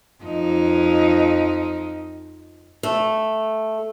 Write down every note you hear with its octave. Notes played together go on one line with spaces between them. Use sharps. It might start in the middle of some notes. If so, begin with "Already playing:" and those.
F2 F3 D#4
A3